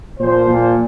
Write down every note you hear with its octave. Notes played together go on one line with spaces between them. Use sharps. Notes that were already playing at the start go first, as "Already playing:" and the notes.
A#2 F3 C5
A#2 F3